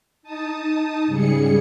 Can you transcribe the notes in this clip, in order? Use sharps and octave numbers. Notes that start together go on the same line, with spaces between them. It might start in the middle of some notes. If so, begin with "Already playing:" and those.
D#4 A5 D#6
G#2 C#3 G3 G#4 C#7